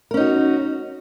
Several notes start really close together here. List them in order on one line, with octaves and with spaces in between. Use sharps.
A#4 C#4 D#4 F#4